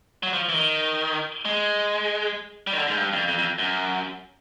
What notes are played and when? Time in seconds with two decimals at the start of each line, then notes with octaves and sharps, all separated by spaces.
0.23 F#3
0.33 F3
0.49 E3
0.54 D#3
1.45 G#3
2.67 G3
2.73 D#3
2.78 D3
2.87 G#2
2.97 G2
3.13 F2
3.28 F2
3.38 F2
3.58 F#2